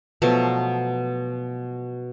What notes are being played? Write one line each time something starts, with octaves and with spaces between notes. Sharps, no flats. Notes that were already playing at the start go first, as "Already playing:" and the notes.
B2 F3 F#3 A3